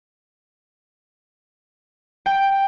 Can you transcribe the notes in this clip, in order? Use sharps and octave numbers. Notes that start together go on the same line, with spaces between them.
G5